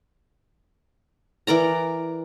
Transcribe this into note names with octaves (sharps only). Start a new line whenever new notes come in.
E3 A#4 D5 A#5